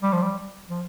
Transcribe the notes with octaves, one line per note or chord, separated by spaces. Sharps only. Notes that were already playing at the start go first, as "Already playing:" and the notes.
G3
F3
G3
F3